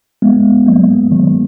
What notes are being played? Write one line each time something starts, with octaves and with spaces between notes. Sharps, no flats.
G#3 B3
F#3 A#3
D#3 F#3